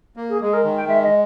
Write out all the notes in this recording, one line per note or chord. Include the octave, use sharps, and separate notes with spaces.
A#3
G#4
G#3 G#4
A#4
D#3
G5
G#3 E5
D#5